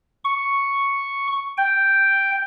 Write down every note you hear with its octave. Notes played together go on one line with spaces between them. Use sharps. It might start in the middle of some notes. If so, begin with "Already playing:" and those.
C#6
G5